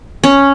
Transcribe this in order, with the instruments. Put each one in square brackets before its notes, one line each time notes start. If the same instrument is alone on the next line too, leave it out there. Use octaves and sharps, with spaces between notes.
[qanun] C#4